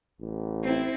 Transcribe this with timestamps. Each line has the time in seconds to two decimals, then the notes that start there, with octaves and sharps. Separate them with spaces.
0.21 A1
0.64 C4 E4